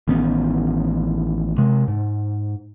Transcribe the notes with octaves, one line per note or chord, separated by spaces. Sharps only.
A1 D#3 B3 C#4
C3 G#3
G#2